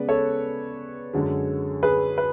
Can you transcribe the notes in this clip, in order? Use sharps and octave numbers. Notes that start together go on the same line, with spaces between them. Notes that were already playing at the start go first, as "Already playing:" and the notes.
Already playing: C#3 G#3 B3 B4 D5
A4 C#5
F#2 D3 G#3
G#4 B4
B4